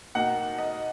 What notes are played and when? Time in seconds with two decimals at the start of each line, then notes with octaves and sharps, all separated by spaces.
0.15 B2 A#3 D#4 F#5
0.58 D#5